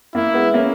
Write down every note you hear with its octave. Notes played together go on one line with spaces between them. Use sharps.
A#3 E4
G#3 B3
A#3 C#4